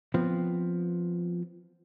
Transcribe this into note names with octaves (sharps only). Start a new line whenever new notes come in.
F3 B3 C4